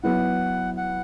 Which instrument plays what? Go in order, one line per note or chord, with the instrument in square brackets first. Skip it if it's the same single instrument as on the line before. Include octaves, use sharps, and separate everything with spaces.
[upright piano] F#3 B3 E4 [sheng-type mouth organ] F#5
[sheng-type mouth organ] F#5